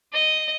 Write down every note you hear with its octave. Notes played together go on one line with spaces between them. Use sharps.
D#5